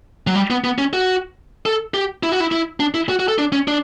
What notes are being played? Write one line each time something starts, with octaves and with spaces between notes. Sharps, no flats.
F#3
G3
B3
B3
C#4
F#4
A4
G4
E4
F#4
E4
E4
D4
E4
F#4
F#4
A4
D4
C#4
D4